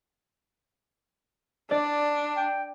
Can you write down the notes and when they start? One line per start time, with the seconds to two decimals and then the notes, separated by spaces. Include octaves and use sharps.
1.71 D4 D5
2.37 G5